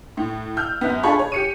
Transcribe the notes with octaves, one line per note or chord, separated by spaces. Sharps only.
A2
E6 F6 G6
F#2 B3
D4 F4 G#4 A4 B5 C#6
G#4 C#5
G4 C#7 D#7